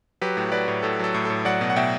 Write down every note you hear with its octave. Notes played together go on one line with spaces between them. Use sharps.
F#3 G4 B4
A2
F#3 B4 D5
A2
A2 A4
F#3 A4
A2
A2 A4
F#3 D5 F#5
B2
F#5
B2 E5 G5